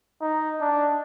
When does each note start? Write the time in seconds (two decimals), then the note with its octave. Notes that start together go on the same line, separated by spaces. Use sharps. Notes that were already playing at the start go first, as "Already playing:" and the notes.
0.22 D#4
0.61 D4